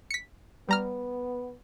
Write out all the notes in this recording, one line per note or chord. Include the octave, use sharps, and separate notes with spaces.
B6 C#7
G3 B3 A#5 F6